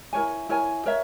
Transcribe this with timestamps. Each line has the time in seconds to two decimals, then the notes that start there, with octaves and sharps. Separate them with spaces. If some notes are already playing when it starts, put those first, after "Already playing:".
0.13 E4 A#4 C#5 G#5
0.49 E4 A#4 C#5 G#5
0.86 A#4 C#5 E5